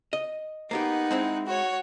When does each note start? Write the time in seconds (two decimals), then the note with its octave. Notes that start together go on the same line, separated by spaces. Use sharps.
0.13 D#5
0.71 A#3 B3 D#4 G4 F#5
1.11 G#3 C4 E4
1.47 F#4 C#5